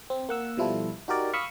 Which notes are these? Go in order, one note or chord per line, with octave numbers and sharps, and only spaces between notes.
C4
A#3 F#5 E6
B2 F3 G3 E4 F4 A4
D#4 F#4 G4 A#4 D5
F5 B5 C#6 D#6 E6